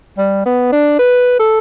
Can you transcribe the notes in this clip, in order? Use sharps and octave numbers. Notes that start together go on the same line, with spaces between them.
G3
B3
D4
B4
A4